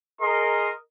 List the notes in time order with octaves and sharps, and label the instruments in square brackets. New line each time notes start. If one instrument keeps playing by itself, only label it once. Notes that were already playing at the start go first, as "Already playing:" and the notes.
[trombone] G#4 [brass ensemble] A#4 D#5 [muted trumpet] C6